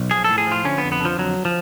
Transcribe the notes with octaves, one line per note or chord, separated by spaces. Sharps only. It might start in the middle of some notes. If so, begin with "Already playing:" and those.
Already playing: B1
F3 G#4
A2 A4
G#4
F3
F4
D3 C#4
F2 B3
B3
D3 F3
F2 F#3
F3